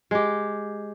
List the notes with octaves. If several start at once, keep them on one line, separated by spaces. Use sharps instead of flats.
G#3 G4